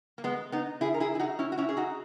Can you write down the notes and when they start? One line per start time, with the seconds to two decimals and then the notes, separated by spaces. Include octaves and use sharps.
0.18 A#3
0.24 G#3 B3
0.52 B3 D#4
0.81 E4 G#4
0.94 A#4
1.00 E4 G#4
1.15 E4
1.19 D#4 F#4
1.39 C#4 E4
1.52 F#4
1.57 C#4 E4
1.69 G#4
1.77 D#4 F#4